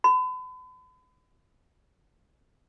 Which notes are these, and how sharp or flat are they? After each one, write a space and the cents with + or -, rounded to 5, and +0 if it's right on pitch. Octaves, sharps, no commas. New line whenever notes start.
B5 +40